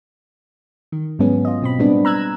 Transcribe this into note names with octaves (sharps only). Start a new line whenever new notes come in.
D#3
G#2 F#3 G#3 B3 C#4
F4 D#5
B2 C4 B5
A2 G3 G#3 B3 C4 D4
A#5 E6 F#6 G#6